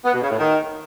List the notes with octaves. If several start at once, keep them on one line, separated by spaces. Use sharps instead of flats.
B3
B2
C#3
A2
D#3